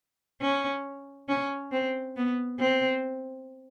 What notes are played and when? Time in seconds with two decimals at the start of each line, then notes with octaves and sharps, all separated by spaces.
0.42 C#4
1.28 C#4
1.72 C4
2.16 B3
2.59 C4